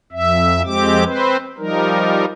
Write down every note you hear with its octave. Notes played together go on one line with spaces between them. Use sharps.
F2 E5
F2 G#3 C4 G4 D6
C4 B4 C5
F3 G3 D#4 A#4